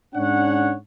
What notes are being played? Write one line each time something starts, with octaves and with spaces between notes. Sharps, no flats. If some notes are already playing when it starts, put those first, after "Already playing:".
G#2 C#4 D4 C#5 F#5